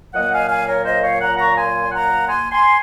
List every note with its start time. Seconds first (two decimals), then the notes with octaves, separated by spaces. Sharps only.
0.14 A#2 F#3 A#3 D#5 F#5
0.32 F5 G#5
0.49 F5 G#5
0.67 A#4 C#5
0.85 C5 D#5
1.03 C#5 F5
1.21 F#5 A#5
1.38 A#5 C#6
1.56 G#5 C6
1.92 F#5 A#5
2.28 G#5 C6
2.52 G#5 C6